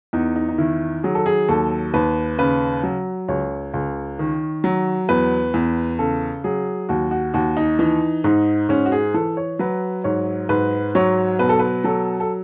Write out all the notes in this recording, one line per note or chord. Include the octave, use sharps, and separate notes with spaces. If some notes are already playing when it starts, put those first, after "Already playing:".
E2 D#4
D#4
D#4
D#3 E4
F#3 G#4
A4
G#4
D#2 A4
D#2 B4
C#3 B4
F#3
C#2 C#5
C#2
D#3
F#3
E2 B4
E2
C#3 A4
F#3 G#4
D#2 F#4
F#4
D#2 F#4
D#4
E3 D#4
G#2 D#4
G#2 C#4
F#4
G#4
E3 A4
C#5
F#3 B4
G#2 C#5
G#2 B4
F#3 C#5
B2 B4
A4
B4
F#3 A4
A4